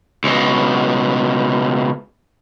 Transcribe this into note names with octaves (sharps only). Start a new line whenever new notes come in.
C#2 B2